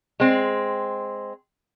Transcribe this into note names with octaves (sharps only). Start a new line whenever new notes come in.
G#3 C4